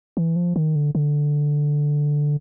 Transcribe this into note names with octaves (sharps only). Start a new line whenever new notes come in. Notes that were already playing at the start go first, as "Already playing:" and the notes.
E3
F3
D#3
D3
D3